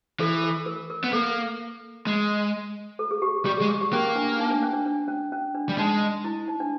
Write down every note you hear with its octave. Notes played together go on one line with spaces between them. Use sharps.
E3 A4
A4
A#4
A#4
B3
A#3 A4
G#3
A4
G#4
G4
G3 G4
G#4
G#3
G#4
G4
A#3 C#4
D4
D#4
D4
C#4
D4
D4
C#4
C#4
D4
G3
G#3 D#4
E4
D#4
D4